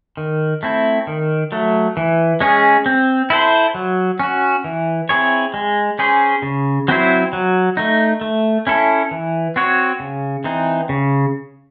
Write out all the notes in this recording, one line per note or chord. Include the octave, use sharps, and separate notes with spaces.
D#3
A3 C4 E4
D#3
F#3 A3
E3
G#3 C#4 G#4
C4
E4 A4 C5
F#3
C#4 F#4
E3
C4 E4 G#4 C#5
G#3
C#4 G#4 C5
C#3
F#3 C4 E4 C5
F#3
A3 D#4
A3
C#4 E4 A4
E3
C4 F#4 C#5
C#3
E3 C4 D#4
C#3